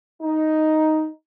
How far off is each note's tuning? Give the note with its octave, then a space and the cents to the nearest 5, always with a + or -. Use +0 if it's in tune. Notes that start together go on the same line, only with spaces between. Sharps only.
D#4 +5